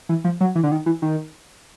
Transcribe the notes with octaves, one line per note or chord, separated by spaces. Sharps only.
E3
F3
F#3
E3
D3
D#3
E3
D#3